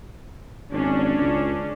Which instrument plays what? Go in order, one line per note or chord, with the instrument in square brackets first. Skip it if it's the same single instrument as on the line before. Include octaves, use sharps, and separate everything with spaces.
[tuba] G#1 [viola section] C#4 D4
[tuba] C#2